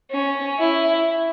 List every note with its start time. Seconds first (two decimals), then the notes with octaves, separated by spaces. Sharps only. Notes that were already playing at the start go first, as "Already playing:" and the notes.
0.11 C#4
0.59 E4